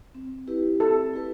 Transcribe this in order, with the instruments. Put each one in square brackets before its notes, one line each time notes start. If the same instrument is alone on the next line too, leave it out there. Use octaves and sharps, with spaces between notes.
[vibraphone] C4
E4 G4 B4
[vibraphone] C4 [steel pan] A4
[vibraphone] E4 G4 B4